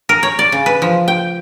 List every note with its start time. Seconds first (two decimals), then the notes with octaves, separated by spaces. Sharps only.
0.09 A#4
0.23 C#5
0.39 D5
0.52 C#3
0.66 B4
0.82 F3
1.08 G5